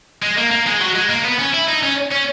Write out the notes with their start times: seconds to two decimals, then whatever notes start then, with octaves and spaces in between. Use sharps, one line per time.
0.23 G#3
0.38 A#3
0.51 A#3
0.67 G#3
0.81 F#3
0.95 G#3
1.09 A#3
1.24 B3
1.39 C#4
1.53 E4
1.68 D#4
1.82 C#4
2.11 C#4